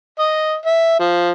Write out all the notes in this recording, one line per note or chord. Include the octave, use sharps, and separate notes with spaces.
D#5
E5
F3